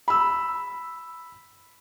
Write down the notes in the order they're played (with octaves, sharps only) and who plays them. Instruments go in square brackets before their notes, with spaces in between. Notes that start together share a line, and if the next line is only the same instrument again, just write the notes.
[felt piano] B5 E6